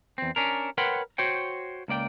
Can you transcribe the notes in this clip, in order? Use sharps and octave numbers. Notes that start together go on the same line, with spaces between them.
E2 C4
C#4 D4 A#4
A#4 B4 C#5 F#5 G5 C6
F#4 C5 C#5 G5
C#2 A#3 D5 G5